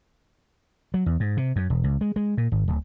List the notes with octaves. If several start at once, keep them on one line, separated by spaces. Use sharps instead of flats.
F#3
E2
G#2
C3
F#2
E1
C#2
G#3
G#3
A#2
G#1
D1